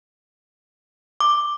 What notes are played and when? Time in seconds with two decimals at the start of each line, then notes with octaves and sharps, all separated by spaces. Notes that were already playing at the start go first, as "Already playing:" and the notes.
1.20 D6